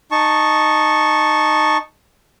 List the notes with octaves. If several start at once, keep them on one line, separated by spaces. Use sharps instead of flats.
D#4 A5 C#6